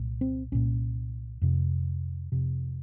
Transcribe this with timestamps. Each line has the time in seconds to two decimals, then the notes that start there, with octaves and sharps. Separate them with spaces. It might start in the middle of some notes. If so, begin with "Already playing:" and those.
Already playing: C2 A#2
0.21 C4
0.52 C2 A#2 C#4
1.42 F2 C3
2.32 F2 C3